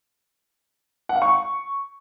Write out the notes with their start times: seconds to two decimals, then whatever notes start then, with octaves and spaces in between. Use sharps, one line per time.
1.09 F#5
1.16 F5
1.22 C#6